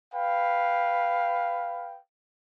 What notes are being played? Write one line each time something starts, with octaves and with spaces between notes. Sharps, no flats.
B4 F5 G5